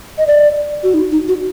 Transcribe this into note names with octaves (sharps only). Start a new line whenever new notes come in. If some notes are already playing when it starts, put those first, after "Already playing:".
D#5
D5
F#4
D#4
D#4
F#4